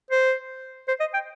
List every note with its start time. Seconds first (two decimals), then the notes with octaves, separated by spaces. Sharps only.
0.11 C5
0.88 C5
1.00 D#5
1.14 G5